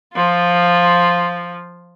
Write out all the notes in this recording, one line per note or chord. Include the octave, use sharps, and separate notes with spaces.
F3 F4